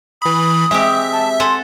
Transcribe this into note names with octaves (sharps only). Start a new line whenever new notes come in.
E3 B5 D#6
G#3 C4 G4 E5
A5
A4 F#5 G#5 C6